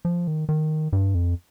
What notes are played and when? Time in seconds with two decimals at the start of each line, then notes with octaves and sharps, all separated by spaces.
0.05 F3
0.27 D#3
0.49 D#3
0.93 G2
1.15 F2